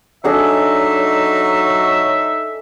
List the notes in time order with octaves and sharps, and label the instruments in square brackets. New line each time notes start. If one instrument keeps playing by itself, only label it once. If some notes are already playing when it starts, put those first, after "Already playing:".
[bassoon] F#3 [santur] D4 G#4 A4 [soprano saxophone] D#4 [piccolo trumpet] E5